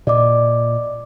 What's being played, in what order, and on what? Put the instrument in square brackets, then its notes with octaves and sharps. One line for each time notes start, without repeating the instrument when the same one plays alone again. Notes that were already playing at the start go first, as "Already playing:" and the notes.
[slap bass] A#2 [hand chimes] D5 D#5 D6